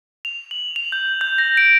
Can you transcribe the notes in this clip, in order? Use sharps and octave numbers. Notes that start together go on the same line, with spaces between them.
F7
F#7
F7
G6
G6
A#6
D7